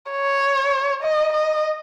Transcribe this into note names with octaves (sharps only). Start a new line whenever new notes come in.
C#5
D#5
D#5